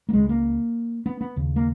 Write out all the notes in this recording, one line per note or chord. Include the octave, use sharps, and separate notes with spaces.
A#3
C#2 C#3 G#3
A#3
B3
B3
D#2 C#3
A#3